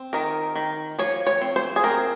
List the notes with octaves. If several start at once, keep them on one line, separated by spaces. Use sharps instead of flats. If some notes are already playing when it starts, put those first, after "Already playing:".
Already playing: C4
D#3 A#4
D#3
F3 C#5
C#5
C4
C5
G#4
C4 A#4